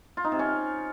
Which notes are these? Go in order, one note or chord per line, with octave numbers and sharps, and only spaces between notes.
F4
D#4
C3
C#4